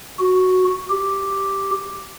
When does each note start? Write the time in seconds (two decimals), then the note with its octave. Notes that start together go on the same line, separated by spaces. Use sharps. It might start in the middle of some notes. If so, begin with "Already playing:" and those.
0.19 F#4
0.90 G4